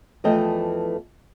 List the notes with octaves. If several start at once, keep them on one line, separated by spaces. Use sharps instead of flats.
E2 E3 F3 A3 D#5 G5